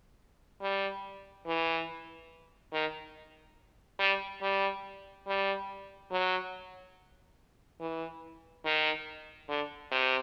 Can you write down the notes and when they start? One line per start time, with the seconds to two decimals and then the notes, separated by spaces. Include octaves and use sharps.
0.62 G3
1.47 E3
2.73 D#3
4.00 G3
4.42 G3
5.27 G3
6.12 F#3
7.81 E3
8.66 D#3
9.49 D3
9.92 C3